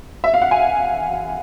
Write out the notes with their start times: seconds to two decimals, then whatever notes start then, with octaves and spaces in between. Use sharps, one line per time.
0.24 E5
0.34 F5
0.42 F#5
0.51 G#5